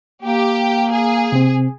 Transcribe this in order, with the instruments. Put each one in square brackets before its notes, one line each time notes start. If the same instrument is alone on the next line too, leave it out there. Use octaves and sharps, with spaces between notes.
[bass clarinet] A#3 [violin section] G4
[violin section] G#4
[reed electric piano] C3 C4